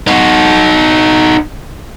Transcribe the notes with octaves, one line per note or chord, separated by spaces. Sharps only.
D#4 F#4